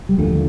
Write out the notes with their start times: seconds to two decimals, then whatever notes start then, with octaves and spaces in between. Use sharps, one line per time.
0.09 G3
0.18 D#2 D3 F3 A3